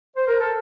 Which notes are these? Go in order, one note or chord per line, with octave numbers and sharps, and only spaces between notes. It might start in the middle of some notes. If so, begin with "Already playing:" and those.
C5
A#4
A4